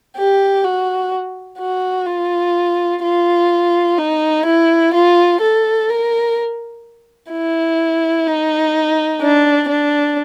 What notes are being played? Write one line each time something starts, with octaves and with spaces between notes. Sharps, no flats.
G4
F#4
F#4
F4
F4
D#4
E4
F4
A4
A#4
E4
D#4
D4
D4